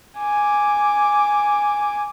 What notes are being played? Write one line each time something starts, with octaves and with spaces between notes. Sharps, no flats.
G#5 D6